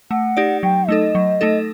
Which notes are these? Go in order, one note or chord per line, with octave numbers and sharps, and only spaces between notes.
A3 F#5
D#4 G4 D5
F#3 G5
A3 D#4 A4 D#5
F#3
A3 D#4 A4